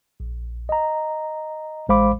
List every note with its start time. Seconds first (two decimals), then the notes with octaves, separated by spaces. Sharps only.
0.20 A#1
0.69 D#5 A#5
1.89 A1 G#3 C5 F5 B5 D6